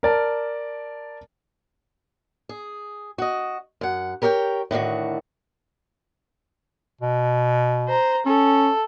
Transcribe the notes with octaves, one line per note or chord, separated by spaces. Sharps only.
A#4 D5 A5
G#4
F#4 D#5
F#2 F#5
G4 A#4 C#5 E5 G5
A2 D3 D#3 F#4
B2
C5 A#5
C#4 A4